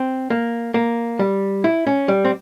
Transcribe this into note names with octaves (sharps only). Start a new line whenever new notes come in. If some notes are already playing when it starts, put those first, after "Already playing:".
Already playing: C4
A#3
A#3
G3
E4
C#4
G3
C4